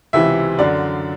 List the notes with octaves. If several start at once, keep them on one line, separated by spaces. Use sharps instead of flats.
C#2 C3 E3 E5
F#2 D3 D5